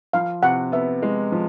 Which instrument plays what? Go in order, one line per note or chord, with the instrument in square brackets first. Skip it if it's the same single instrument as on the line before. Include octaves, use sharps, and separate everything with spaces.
[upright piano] F3 [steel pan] F5
[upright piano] C3 [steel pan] F#5
[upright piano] B3 [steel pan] E5
[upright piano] G#3
F3